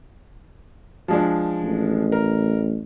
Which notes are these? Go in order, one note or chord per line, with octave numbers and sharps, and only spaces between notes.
F3 G#3 D4
A1
A#4